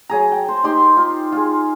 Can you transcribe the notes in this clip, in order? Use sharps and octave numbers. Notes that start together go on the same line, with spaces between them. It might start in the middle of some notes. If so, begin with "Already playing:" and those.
F#3 G#4 A#5
G5
C5
D#4 G4 C6
F4
F4 G#4